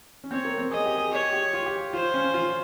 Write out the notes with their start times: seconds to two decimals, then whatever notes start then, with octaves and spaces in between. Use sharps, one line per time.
0.24 C#4
0.31 C4 C#5
0.45 A#3
0.58 C4
0.71 G#4 D#5
0.86 G4
0.98 G#4
1.12 G4 C#5
1.33 G4
1.53 F4
1.66 G4
1.93 F4 C5
2.14 C#4
2.34 F4